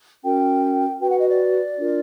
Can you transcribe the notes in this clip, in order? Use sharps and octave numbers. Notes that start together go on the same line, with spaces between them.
C#4 F#4 A#4 G5
F#4 B4 G5
F#5
D#5
D5
D4 F4 A#4